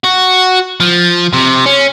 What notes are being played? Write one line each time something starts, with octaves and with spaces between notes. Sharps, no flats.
F#4
F3
C3
C#4